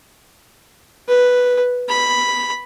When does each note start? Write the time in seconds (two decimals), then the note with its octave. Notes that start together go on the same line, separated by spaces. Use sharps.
1.08 B4
1.89 B5